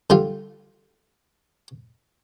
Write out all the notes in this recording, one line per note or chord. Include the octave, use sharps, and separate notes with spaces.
D3 G3 F4